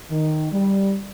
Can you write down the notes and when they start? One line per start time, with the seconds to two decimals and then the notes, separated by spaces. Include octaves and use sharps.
0.11 D#3
0.52 G3